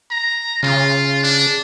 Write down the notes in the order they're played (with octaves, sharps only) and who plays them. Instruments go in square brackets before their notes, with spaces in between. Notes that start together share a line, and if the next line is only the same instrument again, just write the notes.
[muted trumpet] A#5
[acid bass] C#3 [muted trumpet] F4
[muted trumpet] D4